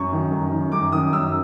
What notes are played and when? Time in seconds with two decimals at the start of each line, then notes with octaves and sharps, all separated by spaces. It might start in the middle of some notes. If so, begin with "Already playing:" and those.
Already playing: F#2 C#6
0.12 D#3
0.32 F#2
0.52 D#3
0.72 F#2 D6
0.92 D#3 D#6
1.12 F#2 E6